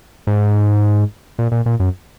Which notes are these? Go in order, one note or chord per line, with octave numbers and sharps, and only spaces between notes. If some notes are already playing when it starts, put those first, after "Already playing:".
G#2
A#2
A#2
A#2
F#2